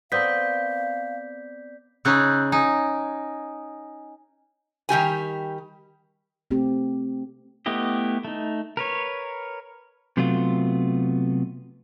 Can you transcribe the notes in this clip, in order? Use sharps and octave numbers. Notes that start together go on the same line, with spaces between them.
B3 C4 A#4 D5 F5 G6 B6
C#3 C#4 D#4 E6 F#6 G6
D#4 G#5
D#3 G3 G4 G#5
A3 C4 G4
A3 B3 E4 G4 D#5
A3 D#4
A#4 B4 C#5
C3 F#3 A3 B3 F4